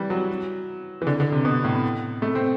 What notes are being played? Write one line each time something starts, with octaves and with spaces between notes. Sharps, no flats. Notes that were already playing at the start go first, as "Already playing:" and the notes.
Already playing: E3 G3
F#3
E3
D3
D3
C3
B2
A2
A3
C4